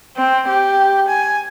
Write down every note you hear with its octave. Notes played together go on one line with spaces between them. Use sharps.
C4
G4
G#5